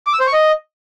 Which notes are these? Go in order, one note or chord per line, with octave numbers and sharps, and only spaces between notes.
D6
E6
C5
C#6
D#5